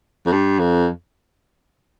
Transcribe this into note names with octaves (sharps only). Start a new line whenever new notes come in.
F2
G2
F2